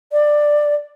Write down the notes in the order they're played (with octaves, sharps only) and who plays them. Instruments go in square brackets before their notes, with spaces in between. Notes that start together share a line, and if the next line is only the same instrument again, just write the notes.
[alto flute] D5